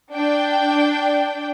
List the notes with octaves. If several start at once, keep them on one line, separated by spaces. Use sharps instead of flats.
D4 G5